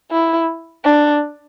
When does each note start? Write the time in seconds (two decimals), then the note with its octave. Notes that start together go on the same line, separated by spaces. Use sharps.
0.11 E4
0.84 D4